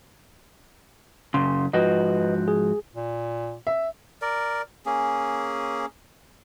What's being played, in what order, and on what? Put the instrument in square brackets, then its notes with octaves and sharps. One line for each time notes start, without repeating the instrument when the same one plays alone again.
[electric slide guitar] F#2 C#3 [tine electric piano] C6
[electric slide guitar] G#2 F3 F#4 [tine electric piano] B4 D#5
[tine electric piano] G#4
[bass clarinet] A#2
[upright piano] E5
[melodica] A#4 D5
A#3 C#4 G#4